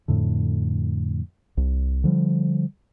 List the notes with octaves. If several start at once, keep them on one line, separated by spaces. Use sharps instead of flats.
F2 A2 D3
C2
D3 F3 G3